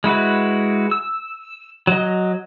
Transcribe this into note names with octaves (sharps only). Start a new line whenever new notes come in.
G#3 E4 F#4 B4
E6
F#3 D#5